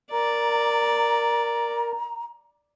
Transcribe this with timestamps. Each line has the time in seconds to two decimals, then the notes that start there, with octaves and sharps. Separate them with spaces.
0.12 A#4 D5 A#5